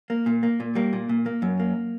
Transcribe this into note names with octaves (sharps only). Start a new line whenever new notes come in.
A#3
A#2
A#3
A#2
G3 A#3
A#2
A#2
A#3
F#2
A#3